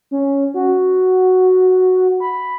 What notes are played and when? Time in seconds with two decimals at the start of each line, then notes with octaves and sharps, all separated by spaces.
0.11 C#4
0.54 F#4
2.20 B5